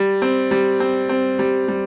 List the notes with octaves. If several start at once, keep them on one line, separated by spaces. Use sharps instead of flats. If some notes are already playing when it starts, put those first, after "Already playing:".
Already playing: G3
C4
G3
C4
C4
G3
G3